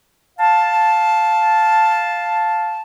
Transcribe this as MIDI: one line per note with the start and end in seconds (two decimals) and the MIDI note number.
0.39 2.82 77
0.39 2.82 81